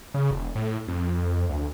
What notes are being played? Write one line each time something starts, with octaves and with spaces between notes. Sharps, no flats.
C#3
E1
A2
F2
D2